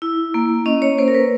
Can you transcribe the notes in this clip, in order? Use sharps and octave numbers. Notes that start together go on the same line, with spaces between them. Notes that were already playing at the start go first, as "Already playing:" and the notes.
E4
A#3
C#4 D#5
C#5
A#3 C5
A#4
B4